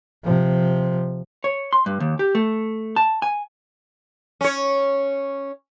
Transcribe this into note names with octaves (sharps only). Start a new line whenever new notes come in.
C3 F3
C#5
C6
G2
D#2
G4
A3
A5
G#5
C#4 C#5